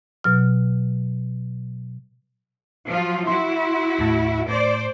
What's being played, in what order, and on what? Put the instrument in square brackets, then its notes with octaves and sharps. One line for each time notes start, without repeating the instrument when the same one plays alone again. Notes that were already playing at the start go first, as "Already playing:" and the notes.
[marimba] B2 F#3 F6
[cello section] F3 F#3 F4
[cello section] E4 F#4 [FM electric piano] C6
[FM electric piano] D#2 A2
[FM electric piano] A2 [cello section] C5 D5